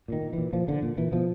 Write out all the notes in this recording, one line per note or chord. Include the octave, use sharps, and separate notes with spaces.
A#2 D#3
A#2
A#2 E3
A#2 F3
A#2 D3
A#2
A#2 E3
B2 F3